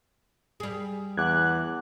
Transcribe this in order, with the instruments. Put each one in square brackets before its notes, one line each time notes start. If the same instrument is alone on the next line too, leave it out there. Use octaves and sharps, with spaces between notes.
[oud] G3 G#4
[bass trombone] E2 [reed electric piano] F#5 D6 G#6 [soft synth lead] F#6